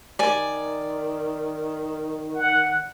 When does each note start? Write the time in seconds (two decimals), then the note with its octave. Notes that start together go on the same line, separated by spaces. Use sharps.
0.19 D#3 D5 G#5
2.35 F#5